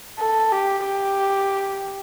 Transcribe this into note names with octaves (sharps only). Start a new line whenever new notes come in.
A4
G4
G4